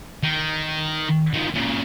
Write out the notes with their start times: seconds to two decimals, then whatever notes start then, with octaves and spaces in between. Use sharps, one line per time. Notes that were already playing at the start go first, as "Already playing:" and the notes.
0.23 D#3
1.34 D#3 F3
1.55 A#2 C#3